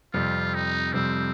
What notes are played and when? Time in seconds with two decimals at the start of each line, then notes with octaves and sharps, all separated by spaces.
0.14 F2 C3 G3 F4
0.54 D#4
0.93 F2 C3 G3 C4